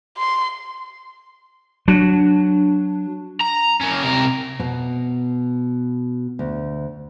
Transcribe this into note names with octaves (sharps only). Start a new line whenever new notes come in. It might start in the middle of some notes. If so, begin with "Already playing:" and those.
C6
F#3 D4
A#5
A#3 C#4
C3 A#4
B2
D2